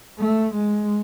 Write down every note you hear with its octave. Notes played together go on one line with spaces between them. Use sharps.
A3
G#3